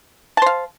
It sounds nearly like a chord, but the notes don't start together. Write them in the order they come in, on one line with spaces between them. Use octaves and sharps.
A5 C5 F5